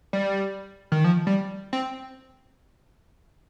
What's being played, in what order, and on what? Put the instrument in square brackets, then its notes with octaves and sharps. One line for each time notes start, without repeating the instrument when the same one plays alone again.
[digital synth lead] G3
D#3
F3
G3
C4